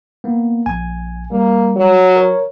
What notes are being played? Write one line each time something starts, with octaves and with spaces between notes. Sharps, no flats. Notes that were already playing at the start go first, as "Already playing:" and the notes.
A#3 B3
A#1 G#5
G3 A#3
F#3
A#4 C#5